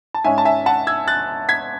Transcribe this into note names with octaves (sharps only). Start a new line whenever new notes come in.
A5
G#2 G#3 C#4 E5 G#5
A5
E5 G#5
F#5 A5
E6 G#6
F#6 A6
G#6 B6